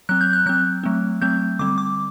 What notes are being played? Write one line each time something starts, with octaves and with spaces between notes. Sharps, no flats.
F#3 C4 F#6
G6
F#6
F#3 C4 F#6
F#3 A3 C4
F#3 A3 C4 G6
D3 G3 C4 D6
D6